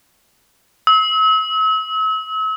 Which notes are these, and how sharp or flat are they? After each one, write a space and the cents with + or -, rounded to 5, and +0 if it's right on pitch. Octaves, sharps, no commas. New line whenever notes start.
E6 -40